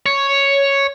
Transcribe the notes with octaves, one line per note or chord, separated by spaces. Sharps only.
C#5